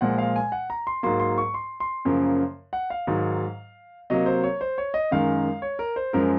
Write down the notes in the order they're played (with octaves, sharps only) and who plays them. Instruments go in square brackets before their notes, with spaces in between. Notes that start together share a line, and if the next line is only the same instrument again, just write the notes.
[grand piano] A#2 F3 G#3 F#5
F5
G#5
F#5
A#5
C6
G#2 F#3 A#3 C6
C6
C#6
C6
C6
F#2 C#3 F3 A#3
F#5
F5
G#2 D#3 F#3
C3 F#3 A#3 D#5
C5
C#5
C5
C#5
D#5
F#2 D#3 G#3 F5
C#5
A#4
C5
F#2 F3 G#3 A#4